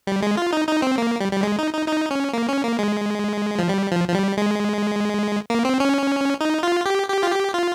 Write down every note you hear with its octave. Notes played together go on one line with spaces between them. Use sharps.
G3
G#3
F4
D#4
D#4
C4
A#3
G3
G3
G#3
D#4
D#4
D#4
C#4
A#3
C#4
A#3
G#3
F3
G3
F3
F3
G3
G#3
A#3
C4
C#4
D#4
F4
G4
G4
F4
G4
F4